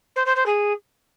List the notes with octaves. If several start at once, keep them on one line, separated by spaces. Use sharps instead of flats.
C5
C5
C5
G#4